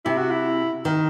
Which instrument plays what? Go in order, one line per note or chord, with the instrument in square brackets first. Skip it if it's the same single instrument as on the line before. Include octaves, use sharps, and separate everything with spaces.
[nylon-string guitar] C3 [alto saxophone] E4
[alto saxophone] F#4
E4
[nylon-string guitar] D#3